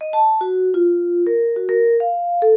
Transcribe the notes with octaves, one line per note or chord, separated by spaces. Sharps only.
D#5
A5
F#4
F4
A#4
F#4
A#4
F5
A4